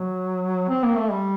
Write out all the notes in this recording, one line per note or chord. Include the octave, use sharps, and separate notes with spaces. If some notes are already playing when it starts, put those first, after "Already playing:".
Already playing: F#3
C4
A#3
A3
G3